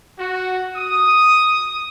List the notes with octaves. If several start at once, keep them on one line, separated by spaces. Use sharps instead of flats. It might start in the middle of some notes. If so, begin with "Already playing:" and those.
F#4
D#6